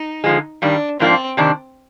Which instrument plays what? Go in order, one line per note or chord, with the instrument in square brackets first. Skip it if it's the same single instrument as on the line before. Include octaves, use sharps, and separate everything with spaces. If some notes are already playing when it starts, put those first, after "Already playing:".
Already playing: [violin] D#4
[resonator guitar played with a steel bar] D3 F3 G#3
[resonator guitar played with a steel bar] G2 D#3 G3 [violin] D4
[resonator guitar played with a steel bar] G#2 F3 A#3 D4 [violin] C4
[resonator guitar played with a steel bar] C3 D#3 A#3 D4